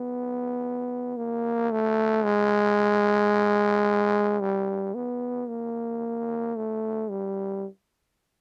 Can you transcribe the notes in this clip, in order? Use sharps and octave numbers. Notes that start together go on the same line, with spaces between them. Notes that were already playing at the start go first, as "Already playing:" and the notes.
Already playing: B3
A#3
A3
G#3
G3
B3
A#3
A3
G3